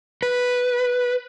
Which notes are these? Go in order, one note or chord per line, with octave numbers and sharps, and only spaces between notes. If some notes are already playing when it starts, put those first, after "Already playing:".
B4